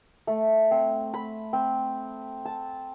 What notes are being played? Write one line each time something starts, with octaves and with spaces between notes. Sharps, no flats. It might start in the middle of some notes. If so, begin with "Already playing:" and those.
A3
C4
B5
C4
A5